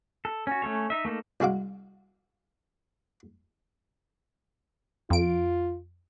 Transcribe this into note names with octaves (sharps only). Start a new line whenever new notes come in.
A4
C#4 F#4
A3 C#4 A4 C#5
D#4 E5
A3 A#3 D#4 A4
C2 G#3 F#4 F5 D6
F2 F4 D7